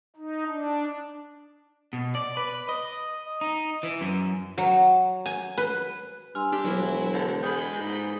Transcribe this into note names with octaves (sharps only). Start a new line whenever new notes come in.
D#4
D4
B2
D5
B4
D#5
D#4
E3
F#2
F#3
G#5
B4
G2 G#5 C6 E6 F6
D4 G4
E1 F#3 E4
D3
G#3 B5 D#6 G6
G#2